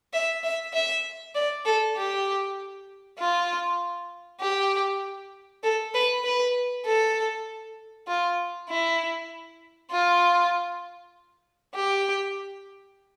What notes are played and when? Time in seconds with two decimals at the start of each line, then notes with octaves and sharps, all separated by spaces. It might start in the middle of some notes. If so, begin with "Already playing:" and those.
0.13 E5
0.43 E5
0.73 E5
1.35 D5
1.65 A4
1.97 G4
3.19 F4
4.41 G4
5.63 A4
5.94 B4
6.24 B4
6.86 A4
8.08 F4
8.69 E4
9.91 F4
11.75 G4